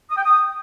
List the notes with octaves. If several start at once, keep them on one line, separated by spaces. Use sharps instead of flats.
D#6
G5
D#6